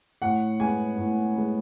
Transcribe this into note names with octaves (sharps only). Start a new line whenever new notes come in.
A2 F#5
G#3 B3 G#5
A2
G#3 B3